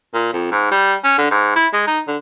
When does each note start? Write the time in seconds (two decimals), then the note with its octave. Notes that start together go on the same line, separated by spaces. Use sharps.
0.14 A#2
0.33 F2
0.51 G#2
0.71 G3
1.04 C#4
1.18 D3
1.31 G#2
1.56 E4
1.73 G#3
1.87 D#4
2.07 D3